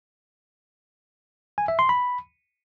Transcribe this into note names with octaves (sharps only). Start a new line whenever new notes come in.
G#5
E5
C6
B5